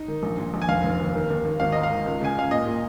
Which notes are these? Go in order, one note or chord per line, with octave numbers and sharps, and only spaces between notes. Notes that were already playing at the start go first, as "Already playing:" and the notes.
Already playing: D#4
D#3
A#1
A#2
A#1
G#5
F1 F5
F1
D#2
D#3
D#2
D#2
G#1 F5
G#2 D#5
F5
D#3
C#2
C#3 G#5
C#2 F5
A#2 D#5
A#2